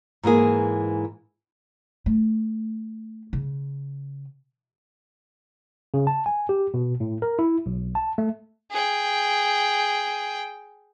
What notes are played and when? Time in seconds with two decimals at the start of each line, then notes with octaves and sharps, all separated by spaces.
0.23 G#2 E3 A#3 G#4
2.06 A3
3.33 C#3
5.94 C#3
6.07 A5
6.26 G#5
6.49 G4
6.74 B2
7.00 A2
7.22 A#4
7.39 E4
7.66 B1
7.95 A5
8.18 A3
8.72 G#4 G5